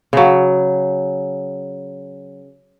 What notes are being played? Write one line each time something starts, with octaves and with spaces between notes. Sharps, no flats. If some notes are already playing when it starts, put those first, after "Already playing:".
C#3 F#3